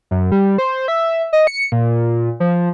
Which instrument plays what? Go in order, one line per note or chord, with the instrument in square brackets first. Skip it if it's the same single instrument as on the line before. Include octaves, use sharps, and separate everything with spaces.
[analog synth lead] F#2
G3
C5
E5
D#5
C#7
A#2
F3